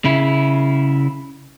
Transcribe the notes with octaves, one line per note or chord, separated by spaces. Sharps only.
C#3 E4